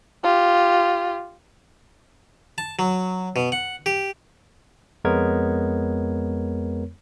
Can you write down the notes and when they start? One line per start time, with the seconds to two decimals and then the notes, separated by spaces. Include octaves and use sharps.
0.24 F4 G4
2.58 A5
2.79 F#3
3.36 B2
3.52 F#5
3.86 G4
5.04 F2 G#3 B3 A#4 C#5 G#6